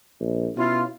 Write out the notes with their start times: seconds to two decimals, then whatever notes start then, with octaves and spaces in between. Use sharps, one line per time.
0.20 A#1
0.57 B2 C#4 E4 F4